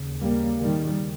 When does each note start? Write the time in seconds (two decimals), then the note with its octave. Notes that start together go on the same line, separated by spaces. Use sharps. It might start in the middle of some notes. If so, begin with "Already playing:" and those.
Already playing: D#2 C#3
0.20 G3 A#3
0.60 D#3 G3